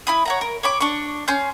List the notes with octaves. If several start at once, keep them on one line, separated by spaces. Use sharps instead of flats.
E4 B5 D#6
C#5 F#5 A#5
A#4
C#5 B5 D6
D4 C#6
C#4 C6 G6